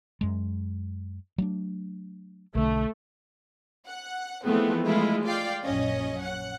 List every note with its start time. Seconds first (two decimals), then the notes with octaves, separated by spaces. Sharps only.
0.21 F#2 G#3
1.38 F#3 A3 D4
2.55 B1 D3 A3
3.88 F#5
4.45 E3 F3 G#3 A3 B3 C4
4.83 G#3 A3 E4 F4
5.24 F4 D5 F5 G5
5.65 A#1 F#2 C#4 D#5
6.21 F#5